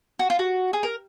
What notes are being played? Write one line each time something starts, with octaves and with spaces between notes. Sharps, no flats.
F#4
F4
F#4
G#4
A#4